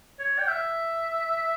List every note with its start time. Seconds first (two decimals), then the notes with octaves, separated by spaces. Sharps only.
0.19 C#5
0.38 G5
0.48 E5